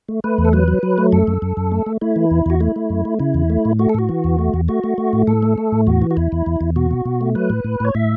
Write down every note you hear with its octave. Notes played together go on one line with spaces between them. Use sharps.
A3
A3 B4
E2
A4
F#3 B4
F#3
F#3
A3
F#2 A4
F#2
F#2
F#2
A3
A3
A3 E4
E3
E2
E2 F#4
A3 E4
A3
F#2
A3
C#3 E4
E2
A3
A2
A3 F#4
A4
A2 F#4
E3
E2
A3
E2
A3 F#4
A3
A3
A2
A2 A4
A3
A3
A2
E2 F#4
E3
F#4
E2 E4
E2
E2
E2
B2 F#4
B2
B2
A3
F#3 B4
A2
A2
A2 C#5
A2 E5